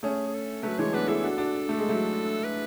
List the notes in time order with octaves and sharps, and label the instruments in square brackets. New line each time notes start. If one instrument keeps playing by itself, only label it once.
[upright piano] A3 C#4 [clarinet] G#4
[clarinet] G#4
A4
[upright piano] F#3 A3 [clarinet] B4
[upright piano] E3 G#3 [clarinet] C#5
[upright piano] B3 D4 [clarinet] B4
[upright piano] E4 G#4 [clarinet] A4
[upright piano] D4 F#4
D4 F#4
A3
G#3
F#3 A3
[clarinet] B4